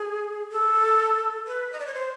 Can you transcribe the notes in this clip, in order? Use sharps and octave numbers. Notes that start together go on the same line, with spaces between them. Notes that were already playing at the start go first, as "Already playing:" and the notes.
Already playing: G#4
A4
B4
D#5
D5
C#5
C5